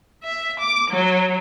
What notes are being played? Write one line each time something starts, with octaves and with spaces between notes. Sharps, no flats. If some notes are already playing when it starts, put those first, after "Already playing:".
E5
D6
F#3